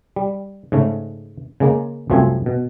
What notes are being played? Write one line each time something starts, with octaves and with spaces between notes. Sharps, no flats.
G3
G#2 C#3 A3
C#3 G#3 A#3
C2 F#2 F3 A3 C4 G#5
B2